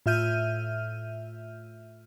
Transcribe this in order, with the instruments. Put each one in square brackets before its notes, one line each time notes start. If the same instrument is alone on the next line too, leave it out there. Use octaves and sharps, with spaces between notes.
[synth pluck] A2 F4 E5 F6 G6 D#7